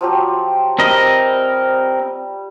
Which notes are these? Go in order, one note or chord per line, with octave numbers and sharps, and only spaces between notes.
F3 F#3 G4
G3 C4 A#4 D#5